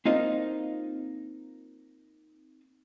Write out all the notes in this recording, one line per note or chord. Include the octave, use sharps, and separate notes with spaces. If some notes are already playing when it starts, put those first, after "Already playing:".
A#3 C4 D#4 F4 D#5